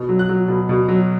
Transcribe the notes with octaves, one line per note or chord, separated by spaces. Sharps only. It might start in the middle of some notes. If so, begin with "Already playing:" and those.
Already playing: B2
F#3
F#6
F#3
B2
B2
F#3